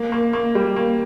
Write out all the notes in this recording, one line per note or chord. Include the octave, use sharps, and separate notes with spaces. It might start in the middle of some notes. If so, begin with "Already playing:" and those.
Already playing: A#3
A#3
A#3
G3
A#3